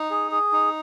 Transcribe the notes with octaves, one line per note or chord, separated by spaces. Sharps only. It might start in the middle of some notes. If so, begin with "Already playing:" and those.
Already playing: D#4
G#4
G#4
D#4